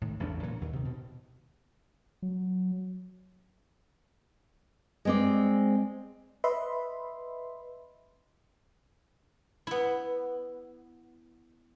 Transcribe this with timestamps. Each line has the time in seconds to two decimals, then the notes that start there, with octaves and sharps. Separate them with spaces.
0.01 A2 D#3
0.20 A1 E2 C#3 D4
0.43 A#2 C#3 E3 F#3
0.61 D#2
0.73 C3 D#3
0.85 B2
2.22 F#3
5.05 G#3 C4 D5
6.44 B4 D#5 E5 B5 C6
9.67 B3 E4